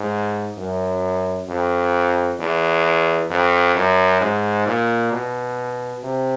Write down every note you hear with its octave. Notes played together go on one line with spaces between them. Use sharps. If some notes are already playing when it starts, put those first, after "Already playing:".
Already playing: G#2
F#2
F2
E2
F2
F#2
G#2
A#2
B2
C3